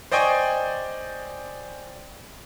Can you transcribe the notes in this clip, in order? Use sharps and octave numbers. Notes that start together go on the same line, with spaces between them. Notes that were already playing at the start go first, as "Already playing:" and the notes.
C5 D5 D#5 G5 G#5 C#6